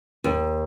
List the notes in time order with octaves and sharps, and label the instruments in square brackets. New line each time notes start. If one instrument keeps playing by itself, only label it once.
[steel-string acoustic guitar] D#2